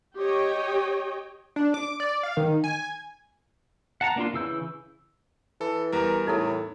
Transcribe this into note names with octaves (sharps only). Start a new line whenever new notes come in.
G4 C#5 D#5 G5
D4
D6
D5
F5
D#3
G#5
F#5 A5 A#5
A#3 D4 F4 C6
C#3 E3 E6 G6
E3 A4
E2 G3 A#4
A2 D#4 E4 A4